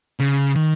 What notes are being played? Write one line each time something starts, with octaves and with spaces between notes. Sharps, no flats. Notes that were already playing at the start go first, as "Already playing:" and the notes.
C#3
D#3